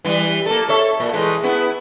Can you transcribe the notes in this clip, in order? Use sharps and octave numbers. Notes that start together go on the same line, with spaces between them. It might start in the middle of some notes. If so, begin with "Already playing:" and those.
E3 G3
A#3 A4
A4 C#5 E5
A#2
E3 G#3 A3
B3 E4